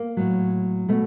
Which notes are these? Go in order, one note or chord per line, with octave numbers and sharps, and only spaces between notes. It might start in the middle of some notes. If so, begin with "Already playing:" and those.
Already playing: A#3
A2 F#3
B2 A3